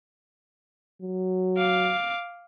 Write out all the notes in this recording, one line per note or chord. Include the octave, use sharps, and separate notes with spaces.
F#3
F5 D6